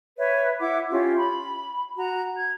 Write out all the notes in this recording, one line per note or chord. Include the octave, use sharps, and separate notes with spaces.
B4 C#5 E5
E4 E5 F#5 D6
C#4 F4 G4
B5
F#4 A#5
G#6